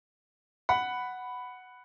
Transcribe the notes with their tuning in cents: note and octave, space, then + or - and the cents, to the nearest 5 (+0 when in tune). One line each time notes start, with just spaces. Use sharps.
F#5 +0 B5 +5